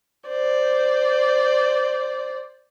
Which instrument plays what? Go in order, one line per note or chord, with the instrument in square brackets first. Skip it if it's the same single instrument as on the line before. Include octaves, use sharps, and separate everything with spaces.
[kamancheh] C5 D5